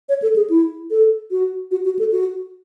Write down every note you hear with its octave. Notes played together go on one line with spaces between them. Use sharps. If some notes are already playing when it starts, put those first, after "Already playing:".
C#5
A4
G#4
E4
A4
F#4
F#4
F#4
A4
F#4